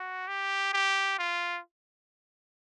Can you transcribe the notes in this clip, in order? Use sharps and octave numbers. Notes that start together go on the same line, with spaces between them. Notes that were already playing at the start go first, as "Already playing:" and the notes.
Already playing: F#4
G4
G4
F4